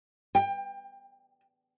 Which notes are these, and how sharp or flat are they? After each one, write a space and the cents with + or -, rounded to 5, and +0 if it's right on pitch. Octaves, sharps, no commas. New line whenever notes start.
G5 +25